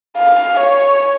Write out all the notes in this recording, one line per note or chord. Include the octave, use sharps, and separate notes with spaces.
F5
C#5